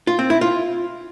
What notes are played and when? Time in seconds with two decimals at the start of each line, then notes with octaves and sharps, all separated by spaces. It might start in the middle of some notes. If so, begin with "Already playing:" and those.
0.07 F4
0.19 C4
0.30 E4
0.41 F4